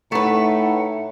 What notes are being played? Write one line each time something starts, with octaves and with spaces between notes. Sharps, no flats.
A2 A3 D#4 B4 F#5